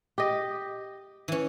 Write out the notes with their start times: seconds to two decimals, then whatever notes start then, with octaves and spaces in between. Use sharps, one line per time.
0.18 G4 D#5
1.28 E3 C#4